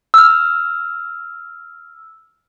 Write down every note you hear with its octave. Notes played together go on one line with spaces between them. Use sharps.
E6 F6